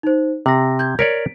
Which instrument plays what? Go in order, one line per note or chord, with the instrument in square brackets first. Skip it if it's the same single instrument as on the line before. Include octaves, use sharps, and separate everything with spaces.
[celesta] D#4 C5
[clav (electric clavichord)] C3 [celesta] C6 A#6
[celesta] G6 G#6
[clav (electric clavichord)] A#4 C#5 D5 [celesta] B6 D7